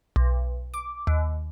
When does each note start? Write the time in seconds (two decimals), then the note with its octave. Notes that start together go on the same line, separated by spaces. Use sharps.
0.16 B1
0.74 D6
1.07 D#2